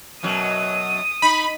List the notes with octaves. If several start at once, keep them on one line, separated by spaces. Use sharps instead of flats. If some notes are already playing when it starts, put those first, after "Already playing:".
F#2 B2 F#3 D#6
D#4 B5